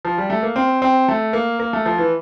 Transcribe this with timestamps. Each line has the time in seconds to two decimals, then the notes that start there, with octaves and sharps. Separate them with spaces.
0.05 F3
0.18 G3
0.30 A3
0.43 A#3
0.56 C4
0.82 C4
1.08 A3
1.33 A#3
1.60 A#3
1.73 A3
1.86 F3
1.98 E3